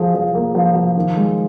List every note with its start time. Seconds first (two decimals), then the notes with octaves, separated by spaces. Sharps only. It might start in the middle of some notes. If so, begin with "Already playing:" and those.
Already playing: F3 G#4
0.14 F3
0.35 A#3
0.55 F3
0.75 F3
0.96 D#3
1.16 G#3